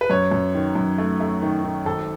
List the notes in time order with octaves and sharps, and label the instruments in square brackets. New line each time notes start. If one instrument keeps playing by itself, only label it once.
[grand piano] B4
F#2 C#5
F#2
D#3
F#2
A3
A3
D#3
D#3
G#1 A4